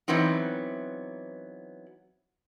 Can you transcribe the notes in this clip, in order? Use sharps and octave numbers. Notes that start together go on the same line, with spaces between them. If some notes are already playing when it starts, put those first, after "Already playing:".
E3 F#3 B3 C4 D#4